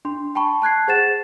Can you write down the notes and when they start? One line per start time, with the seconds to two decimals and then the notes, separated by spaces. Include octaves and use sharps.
0.05 D4 C6
0.35 G5 A5 B5 C#6
0.62 A5 F#6 G#6 C7
0.88 G#4 C5 F#5 A6 E7